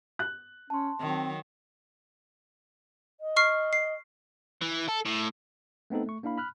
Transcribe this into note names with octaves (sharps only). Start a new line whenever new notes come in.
F#6
C#4 A5 C6
D#3 F#3 C4
D#5
C#6 F6 C7
C7
E3
A4
A2
A3 B3 C4 D#4 A4
A3 C#6
A#3 D4 E4 F5 B5
B5 F6 F#6